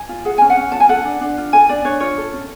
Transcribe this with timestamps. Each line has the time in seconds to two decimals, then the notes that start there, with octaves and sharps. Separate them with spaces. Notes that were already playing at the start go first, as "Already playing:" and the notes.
Already playing: G#5
0.09 F4
0.25 G#4 F#5
0.38 C#4 G#5
0.50 F#5
0.57 C#4
0.72 F4 A5
0.80 G#5
0.89 A4 F#5
1.05 D4
1.21 D4
1.37 F4
1.53 A4 G#5
1.69 D4 D5
1.85 D4 C#5
2.00 F4 C#5
2.17 A4
2.33 C#4